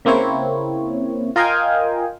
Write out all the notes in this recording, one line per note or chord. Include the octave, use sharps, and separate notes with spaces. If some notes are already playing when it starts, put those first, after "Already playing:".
C#3 A#3 C4 E4 C#5
F4 A#4 D#5 F5 G5 G#5